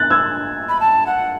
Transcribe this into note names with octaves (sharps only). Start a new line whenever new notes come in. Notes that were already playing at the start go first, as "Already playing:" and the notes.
Already playing: F#6 A6
E6 G#6
B5
A5
F#5